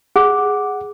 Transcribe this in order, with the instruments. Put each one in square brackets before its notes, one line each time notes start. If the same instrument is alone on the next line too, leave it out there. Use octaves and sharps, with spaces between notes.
[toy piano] G#4 [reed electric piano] F#5